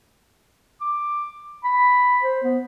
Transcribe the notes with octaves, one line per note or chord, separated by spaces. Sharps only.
D6
B5
C5
B3